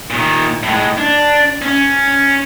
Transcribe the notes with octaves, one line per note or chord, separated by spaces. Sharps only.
A#2 D#3
A2 G#3
D4
C#4